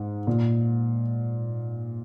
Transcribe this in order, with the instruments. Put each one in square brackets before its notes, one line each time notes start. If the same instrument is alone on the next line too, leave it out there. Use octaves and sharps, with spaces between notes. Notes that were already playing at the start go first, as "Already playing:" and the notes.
Already playing: [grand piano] G#2
A#2